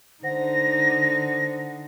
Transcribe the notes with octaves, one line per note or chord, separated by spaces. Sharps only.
D3 D#4 C5 F#5 A#6